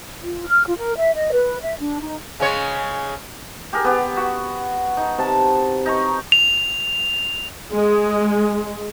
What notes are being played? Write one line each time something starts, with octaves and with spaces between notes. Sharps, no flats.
F4
F6
F4
A#4
E5
D#5
B4
E5
D4
D#4
C#3 G#3 C#5
G4 G#4 A#4
B3 G4
F#4
D#4
C3 A5
D#4 A#5 C#6
F7
G#3